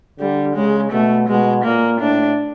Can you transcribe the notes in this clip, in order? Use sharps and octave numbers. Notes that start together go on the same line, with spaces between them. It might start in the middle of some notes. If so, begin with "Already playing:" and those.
D3 G3
C#3 G#3
B2 A3
B2 G#3
A#2 A#3
A2 D4